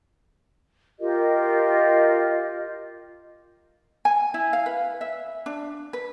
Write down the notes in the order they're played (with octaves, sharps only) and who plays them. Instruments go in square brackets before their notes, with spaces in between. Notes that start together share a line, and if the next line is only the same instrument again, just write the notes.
[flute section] F4 G4 A#4 D#5
[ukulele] G#5
E4
F5
B4
E5
D4
B4